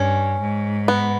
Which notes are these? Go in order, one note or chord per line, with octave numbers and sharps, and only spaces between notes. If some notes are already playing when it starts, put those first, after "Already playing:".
Already playing: G2 C#4
G#2
B3